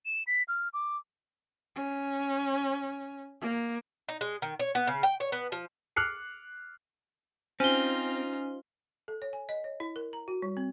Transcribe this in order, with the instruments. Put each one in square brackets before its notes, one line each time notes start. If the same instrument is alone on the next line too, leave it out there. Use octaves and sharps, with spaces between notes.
[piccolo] E7
B6
F6
D6
[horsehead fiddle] C#4
A#3
[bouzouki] D#4
G#3
D#3
C#5
B3
C#3
G5
C#5
B3
F3
[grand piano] D6 F6 F#6 C7 C#7
[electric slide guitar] C4 [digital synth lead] C#4 [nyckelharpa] D#4 F4 [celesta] C5 G7
[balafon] A4
C#5
G#5
D#5
C#5
E4
A#4
A#5
F#4
G3
C4